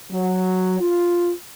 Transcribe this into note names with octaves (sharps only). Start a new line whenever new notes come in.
F#3
F4